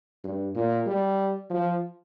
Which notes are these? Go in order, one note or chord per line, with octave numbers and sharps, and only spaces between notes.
G2
A#2
G3
F3